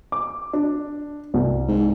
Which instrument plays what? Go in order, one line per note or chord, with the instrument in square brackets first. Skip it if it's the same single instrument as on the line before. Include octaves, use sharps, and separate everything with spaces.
[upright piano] D6
D4
C2
[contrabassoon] G#2